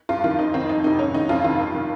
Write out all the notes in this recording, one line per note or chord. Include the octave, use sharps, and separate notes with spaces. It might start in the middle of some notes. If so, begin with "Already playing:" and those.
G2 F4
D#3 F4
F2 D#4
D#3 C4
F2 D#4
C3 D#3 D#4
G#2 C#4
D#3 D#4
F2 F4
C3 D#3 F4
G2
D#3